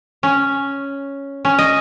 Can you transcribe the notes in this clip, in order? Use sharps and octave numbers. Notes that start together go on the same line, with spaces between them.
C#4
C#4
D#5